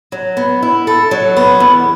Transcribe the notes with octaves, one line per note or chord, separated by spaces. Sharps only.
F#3
B3
E4
A4
F#3
B3
E2